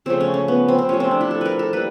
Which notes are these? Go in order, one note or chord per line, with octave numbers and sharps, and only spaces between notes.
C#3 F3 A3 C4
C#4
C#4
B3
C4
C4
C3 F3 A3 C#4
C4
D4
E4
A4
A#4 B4
A4
G3 A#3 B4